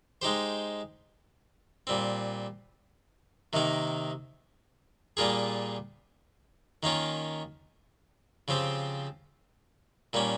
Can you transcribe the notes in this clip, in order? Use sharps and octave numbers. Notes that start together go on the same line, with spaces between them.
G#3 D#4 G4 C5
A#2 G3 C4
C3 D#3 A#3 D#4
A#2 G3 A#3 F4 G#4
D#3 A#3 C#4 F4
C#3 F3 C4 G4
A#2 G3 A#3 C#4